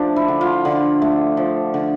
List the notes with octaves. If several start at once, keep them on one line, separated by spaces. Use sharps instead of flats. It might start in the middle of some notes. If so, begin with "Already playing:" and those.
Already playing: F3 A3 D4
E4
D3
F4
D3
A3
F3
D3